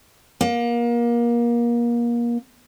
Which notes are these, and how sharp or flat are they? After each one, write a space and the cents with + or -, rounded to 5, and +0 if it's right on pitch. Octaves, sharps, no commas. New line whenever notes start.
A#3 +30